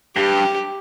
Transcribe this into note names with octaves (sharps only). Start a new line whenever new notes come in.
G2 G4